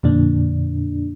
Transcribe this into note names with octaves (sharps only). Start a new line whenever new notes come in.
F2 A#2 D3 D4